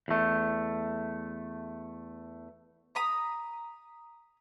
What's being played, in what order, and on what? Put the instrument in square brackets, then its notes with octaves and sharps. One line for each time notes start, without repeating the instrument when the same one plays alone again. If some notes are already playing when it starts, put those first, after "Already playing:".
[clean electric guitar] E2 A3
[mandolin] A#5 B5 D#6